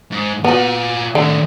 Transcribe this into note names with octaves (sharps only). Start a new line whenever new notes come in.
G#2
A#2 B3 F#4 G#5
A2 D3 D#3